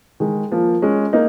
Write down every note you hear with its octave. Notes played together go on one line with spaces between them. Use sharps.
D#3 G#3
F3 A#3
G#3 C#4
A#3 D#4